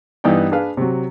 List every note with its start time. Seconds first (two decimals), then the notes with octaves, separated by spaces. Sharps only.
0.24 G2 E3 B3 D#4 D5 G5
0.52 D4 G#4 B4 F5
0.77 C3 F#3